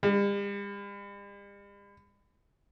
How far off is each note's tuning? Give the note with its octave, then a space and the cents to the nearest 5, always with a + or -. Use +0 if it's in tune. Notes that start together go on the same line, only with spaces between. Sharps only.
G3 +45